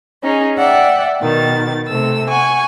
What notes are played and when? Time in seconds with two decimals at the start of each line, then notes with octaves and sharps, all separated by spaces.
0.23 C#4 D#4 G#4
0.57 D5 E5 F#5 G5
1.21 B2 D#3 A6
1.88 C3 A3 E6
2.29 F#5 G#5 C#6